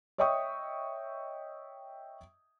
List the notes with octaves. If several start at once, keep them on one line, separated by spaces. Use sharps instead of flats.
C#5 D#5 E5 G5 C#6 D#6